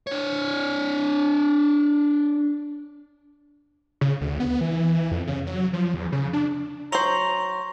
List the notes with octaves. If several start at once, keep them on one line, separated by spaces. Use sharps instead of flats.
D4 C#5
C#3
D2
B3
E3
F2
C#3
F#3
F3
E2
C#3
D4
F#3 C5 A#5 C6 C#6 F7